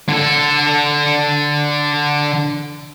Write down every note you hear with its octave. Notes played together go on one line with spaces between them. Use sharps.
D3 A4